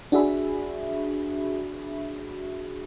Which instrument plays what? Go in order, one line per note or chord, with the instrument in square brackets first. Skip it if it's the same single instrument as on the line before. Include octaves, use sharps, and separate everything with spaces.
[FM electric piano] D4 F#4 G#4 E5 B5